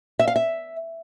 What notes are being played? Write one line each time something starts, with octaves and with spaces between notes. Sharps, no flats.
E5
F5
E5